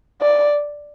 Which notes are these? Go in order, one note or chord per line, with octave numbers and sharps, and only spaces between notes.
D5